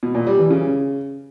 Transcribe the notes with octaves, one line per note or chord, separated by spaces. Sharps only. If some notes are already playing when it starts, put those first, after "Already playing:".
B2
A#2
G3
E3
C#3